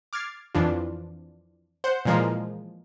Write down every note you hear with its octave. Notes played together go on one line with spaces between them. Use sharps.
D6 F6 G#6 A6 C7
F2 E3 F3 D4 F4
C5 F#5 G6
A#2 E3 F3 G#3 A#3 F4